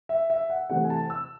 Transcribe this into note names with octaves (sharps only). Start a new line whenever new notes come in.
E5
E5
F#5
C3 E3 A3 C4 F#5
G#5
A5
E6